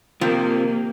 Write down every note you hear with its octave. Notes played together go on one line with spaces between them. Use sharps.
C3 D#3 F3 A#3 C4 F4 G4